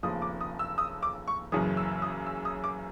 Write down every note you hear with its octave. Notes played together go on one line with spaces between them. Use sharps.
F1 D#2 C#3 F3 D#6
D6
D#6
E6
D#6
D6
C#6
F#1 F#2 C#3 E3 D#6
E6
D#6
E6
D#6
D6